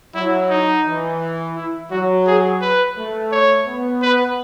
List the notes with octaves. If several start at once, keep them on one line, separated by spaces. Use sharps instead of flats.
F#3 E4
D#4
E3
E4
F#3 F#4
G#4
B4
A3
C#5
B3
B4